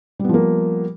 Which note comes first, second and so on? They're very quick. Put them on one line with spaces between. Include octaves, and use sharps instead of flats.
G3 B3 F3 A#3